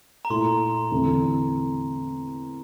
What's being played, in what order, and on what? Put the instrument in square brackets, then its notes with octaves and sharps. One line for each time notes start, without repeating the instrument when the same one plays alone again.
[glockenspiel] A#5
[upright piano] A#2 A3 E4 [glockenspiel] C6
[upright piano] E2 D3 A3 C4 E4